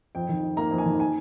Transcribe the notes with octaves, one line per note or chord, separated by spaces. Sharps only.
F2 G5
D#3
D#4
A#3 A#5
F2
G#5
D#3
G#5